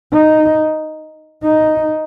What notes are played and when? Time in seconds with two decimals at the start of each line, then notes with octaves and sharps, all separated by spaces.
0.13 D#4
1.44 D#4